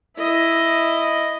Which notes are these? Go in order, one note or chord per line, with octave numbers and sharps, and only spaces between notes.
E4 D#5